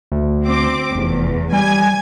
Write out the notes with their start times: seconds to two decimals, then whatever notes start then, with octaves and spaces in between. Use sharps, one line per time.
0.12 D2
0.44 C4 D6
0.95 F1 E2
1.52 G3 G#5 G#6